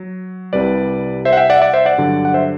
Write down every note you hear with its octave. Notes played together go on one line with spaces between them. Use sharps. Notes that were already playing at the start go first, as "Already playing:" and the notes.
Already playing: F#3
C2 C3 G3 B4 D5
C5 E5
F#5
E5 G5
D5 F#5
E5
D5 F#5
C5 E5
D5 F#5
G2 D3 F#3
F#5
C5 E5